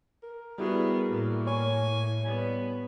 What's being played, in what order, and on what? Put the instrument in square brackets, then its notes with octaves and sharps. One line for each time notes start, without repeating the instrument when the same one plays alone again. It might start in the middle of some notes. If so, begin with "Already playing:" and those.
[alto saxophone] A#4
[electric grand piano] G3 E4 F#4 [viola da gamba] B3 [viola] G#4
[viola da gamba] A2 [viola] A#3
[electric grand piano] C#5 C#6 [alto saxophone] G#5
[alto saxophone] G3 [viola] B3